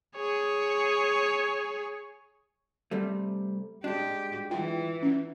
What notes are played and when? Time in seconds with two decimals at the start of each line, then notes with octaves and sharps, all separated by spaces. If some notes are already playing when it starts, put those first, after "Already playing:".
0.16 G#4 C#5
2.91 C3 G3 A3
3.84 G#3 D4 G4
4.51 E3 F4 G5
5.02 C#4